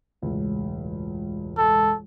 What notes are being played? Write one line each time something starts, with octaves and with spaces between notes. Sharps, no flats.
E1 C#2 A2
A4